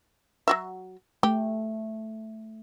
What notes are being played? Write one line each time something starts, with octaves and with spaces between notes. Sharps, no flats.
F#3 F#4 E5
A3 G4